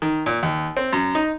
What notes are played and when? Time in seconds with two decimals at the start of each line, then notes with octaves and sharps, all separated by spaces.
0.02 D#3
0.26 A#2
0.43 D#2
0.77 C4
0.93 F#2
1.15 D#4